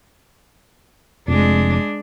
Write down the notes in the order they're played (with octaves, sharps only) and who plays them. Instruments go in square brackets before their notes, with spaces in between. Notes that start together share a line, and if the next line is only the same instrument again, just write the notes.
[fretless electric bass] F1 F2 [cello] G#3 D4